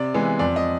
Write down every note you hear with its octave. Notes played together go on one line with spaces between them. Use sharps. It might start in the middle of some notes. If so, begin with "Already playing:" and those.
Already playing: C3 D5
E3 G#3 B3
F2 D5
D#5